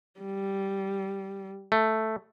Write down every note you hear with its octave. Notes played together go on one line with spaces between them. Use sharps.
G3
A3